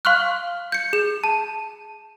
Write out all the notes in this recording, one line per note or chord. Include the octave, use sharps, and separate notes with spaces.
F5 C6 C#6 F6 F#6
G6 C#7
G#4 E7
A5